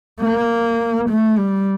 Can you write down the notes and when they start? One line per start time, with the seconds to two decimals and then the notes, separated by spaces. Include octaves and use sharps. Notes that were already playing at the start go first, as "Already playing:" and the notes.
0.20 A#3
1.09 A3
1.38 G3